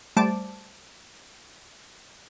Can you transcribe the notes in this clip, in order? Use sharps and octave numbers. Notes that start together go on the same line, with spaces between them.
G3 A3 C5 A5 D6 D7